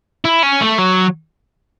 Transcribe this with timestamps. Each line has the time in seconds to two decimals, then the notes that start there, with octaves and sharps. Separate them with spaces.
0.25 E4
0.43 C#4
0.61 A3
0.79 F#3